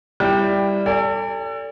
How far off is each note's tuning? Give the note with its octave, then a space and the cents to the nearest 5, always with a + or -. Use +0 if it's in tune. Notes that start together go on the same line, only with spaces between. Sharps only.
G3 +10 E4 +5 G5 +0
A4 +35 D5 -30 G#5 -45